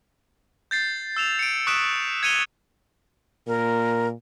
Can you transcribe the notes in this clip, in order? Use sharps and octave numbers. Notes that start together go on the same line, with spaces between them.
G6 A6 C7
E6 E7 F7
C#7 D7
C#6 D#6 F#6 B6 D7 E7
G#6 C#7 D#7 F7 G7
A#2 A#4